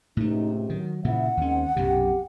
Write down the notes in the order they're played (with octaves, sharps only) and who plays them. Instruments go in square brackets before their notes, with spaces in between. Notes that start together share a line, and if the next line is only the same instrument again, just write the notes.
[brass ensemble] C#2 C3 [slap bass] A2 A3 [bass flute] D#4
[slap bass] D#3 [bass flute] F#3
[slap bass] A#2 C#3 [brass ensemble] F3 E4 E5 [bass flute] F#5
[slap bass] D#2 C#4 [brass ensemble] D#3 G#3 C4
[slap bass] B1 F#2 C3 [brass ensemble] G4